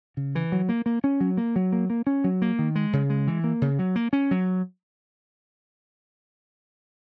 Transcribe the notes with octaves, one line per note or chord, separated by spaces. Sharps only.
C#3
E3
F#3
A#3
A#3
C#4
F#3
A#3
F#3
A#3
A#3
C#4
F#3
A#3
D#3
G#3
C#3
G#3
E3
A#3
C#3
F#3
A#3
C#4
F#3